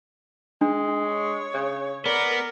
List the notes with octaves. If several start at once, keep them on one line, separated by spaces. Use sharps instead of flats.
G#3 D4
C#5
C#3
B3 A#4 D5